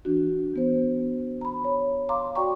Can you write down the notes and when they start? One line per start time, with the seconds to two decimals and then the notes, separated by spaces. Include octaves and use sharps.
0.05 E3 D4 F#4
0.54 E3 B3 C5
1.41 A#5 B5
1.64 C#5
2.09 F5 A#5 C6 D6
2.35 F#4 D5 G5 A#5 C#6